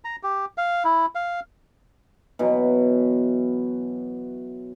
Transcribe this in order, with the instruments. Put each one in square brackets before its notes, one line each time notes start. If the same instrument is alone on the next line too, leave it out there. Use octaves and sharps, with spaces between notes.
[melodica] A#5
G4
F5
E4
F5
[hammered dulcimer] B2 E3 F#3